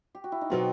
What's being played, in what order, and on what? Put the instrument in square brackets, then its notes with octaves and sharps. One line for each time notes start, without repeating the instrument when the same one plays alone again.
[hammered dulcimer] G4
F#4
E4
D#4
[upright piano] B2 F#3 B3 [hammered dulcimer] C4